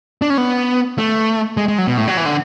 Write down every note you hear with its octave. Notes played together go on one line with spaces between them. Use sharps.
D4
C#4
B3
A3
G#3
G#3
F#3
B2
A2
F#3
E3
D3